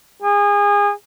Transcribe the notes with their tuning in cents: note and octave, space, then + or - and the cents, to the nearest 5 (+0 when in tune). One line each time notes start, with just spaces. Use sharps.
G#4 -30